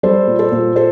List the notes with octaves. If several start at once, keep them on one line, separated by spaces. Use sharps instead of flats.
G3 A4 C5
A#2
A4 C5
A#2
A4 C5